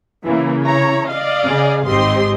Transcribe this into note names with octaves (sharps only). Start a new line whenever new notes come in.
C#3 E3 A#3
E4 C#5 A#5
D5 D#5 F5
C#3 G#4
G#1 G#2 C4 G4 D#5 C6